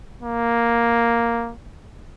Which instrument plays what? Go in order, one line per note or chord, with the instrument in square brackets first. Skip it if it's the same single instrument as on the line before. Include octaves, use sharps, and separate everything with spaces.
[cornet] A#3